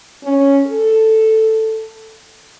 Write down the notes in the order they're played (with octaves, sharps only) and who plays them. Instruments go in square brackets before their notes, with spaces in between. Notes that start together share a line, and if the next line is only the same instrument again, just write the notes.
[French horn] C#4
A4